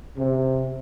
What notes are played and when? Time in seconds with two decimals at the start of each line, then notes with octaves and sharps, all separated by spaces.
0.18 C3